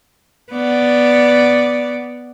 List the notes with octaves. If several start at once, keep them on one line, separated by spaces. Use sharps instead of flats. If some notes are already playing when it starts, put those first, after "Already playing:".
B3 D5